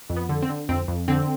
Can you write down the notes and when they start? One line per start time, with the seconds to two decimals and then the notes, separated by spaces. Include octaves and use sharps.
0.10 F2
0.16 B3
0.29 D3
0.42 C4
0.49 D3
0.69 F2 C4
0.88 F2
1.08 D3 C4